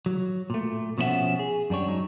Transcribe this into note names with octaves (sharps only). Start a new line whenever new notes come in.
F#3
A#2 A3
B2 F3 C#4 D#4 E5 F#5
G#4
F#2 G3 D4 C#5
F#3 D#4